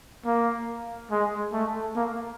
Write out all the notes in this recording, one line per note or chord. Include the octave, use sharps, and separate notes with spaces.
A#3
G#3
A3
A#3